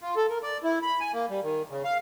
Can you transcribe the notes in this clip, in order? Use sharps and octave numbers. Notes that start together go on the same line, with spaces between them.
F4
A4
A#4
D5
E4
B5
G#5
A#3
G3
D#3
C#3
F5